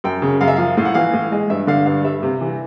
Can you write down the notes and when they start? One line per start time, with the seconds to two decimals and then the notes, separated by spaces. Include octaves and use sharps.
0.04 F#2 G5
0.22 C#3
0.41 F#2 F5
0.48 E5
0.56 F3 F5
0.77 A2 F5
0.85 F#5
0.94 E3 F5
1.14 A2
1.32 G#3
1.50 G2 E5
1.67 D3 F5
1.86 G2 F5
2.04 G3 E5
2.23 C3
2.41 E3